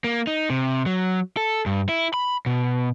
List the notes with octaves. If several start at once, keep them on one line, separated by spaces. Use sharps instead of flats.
A#3
D#4
C3
F#3
A4
G2
E4
B5
B2